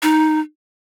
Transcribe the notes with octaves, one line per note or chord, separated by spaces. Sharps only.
D#4